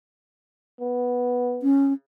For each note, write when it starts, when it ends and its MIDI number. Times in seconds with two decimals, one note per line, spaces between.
0.80 1.65 59
1.62 1.93 61